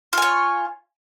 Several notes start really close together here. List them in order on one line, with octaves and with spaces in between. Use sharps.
F4 G#5 C#5